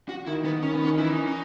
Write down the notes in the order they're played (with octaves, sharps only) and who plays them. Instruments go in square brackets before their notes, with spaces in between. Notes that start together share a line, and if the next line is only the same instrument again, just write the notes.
[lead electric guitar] F#4
[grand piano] D#3 [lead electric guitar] E4
[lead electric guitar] B3
[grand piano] D#3 [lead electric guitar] C#4
[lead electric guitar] B3
C#4
[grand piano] D#3
[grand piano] E3 [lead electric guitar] E4
[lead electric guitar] D#4
C#4
D#4